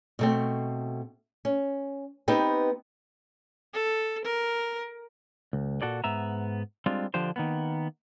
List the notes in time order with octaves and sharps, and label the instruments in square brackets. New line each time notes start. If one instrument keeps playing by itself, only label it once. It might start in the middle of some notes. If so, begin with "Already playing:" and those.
[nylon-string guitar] B2 A3 C4
C#4
B3 C4 D#4 G4 B4
[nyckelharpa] A4
A#4
[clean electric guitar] C#2
A#2 F#4 A4 D5
G#2 B3 E5 A#5
G3 G#3 C4 D4 F4
D3 F3 D4 G4 C5
D#3 A#3 B3